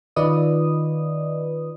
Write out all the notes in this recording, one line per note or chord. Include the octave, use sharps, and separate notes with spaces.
D#3 F4 B4 D5 D#5 D#6